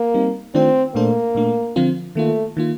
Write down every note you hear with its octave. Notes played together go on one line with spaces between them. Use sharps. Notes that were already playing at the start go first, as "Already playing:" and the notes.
Already playing: A#3
G3 C4 D#4
D#3 A3 C4 D4 F4 C5
A#2 A3 A#3 D4 A4 C5
A#2 A3 D4
D3 F3 C4 F4
D#3 A3 A#3 F4
D#3 A#3 F4